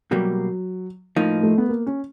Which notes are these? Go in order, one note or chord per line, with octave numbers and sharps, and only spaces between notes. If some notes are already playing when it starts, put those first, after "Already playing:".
B2 F#3 G3 A#3
A2 F3 A#3 D#4
A3
B3
A#3
C#4